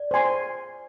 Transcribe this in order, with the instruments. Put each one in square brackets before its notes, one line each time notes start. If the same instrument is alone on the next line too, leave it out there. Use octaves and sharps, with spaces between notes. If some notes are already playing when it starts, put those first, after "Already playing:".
Already playing: [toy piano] D5
[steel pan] C5 G#5 C6